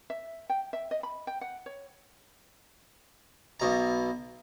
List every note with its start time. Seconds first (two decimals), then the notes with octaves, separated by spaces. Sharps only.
0.10 E5
0.50 G5
0.73 E5
0.91 D#5
1.03 B5
1.27 G5
1.41 F#5
1.66 C#5
3.60 B1 B2 A#5